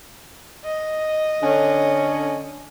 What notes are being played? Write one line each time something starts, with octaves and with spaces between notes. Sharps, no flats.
D#5
D3 C#4